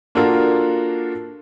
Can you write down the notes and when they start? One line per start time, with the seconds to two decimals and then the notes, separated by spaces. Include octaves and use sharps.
0.15 A#3 D4 F4 F#4 A4 A#4